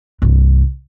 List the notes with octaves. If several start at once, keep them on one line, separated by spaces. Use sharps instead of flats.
C2 G2